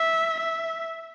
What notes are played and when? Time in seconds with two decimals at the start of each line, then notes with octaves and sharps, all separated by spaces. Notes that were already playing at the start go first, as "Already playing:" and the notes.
Already playing: E5
0.40 E5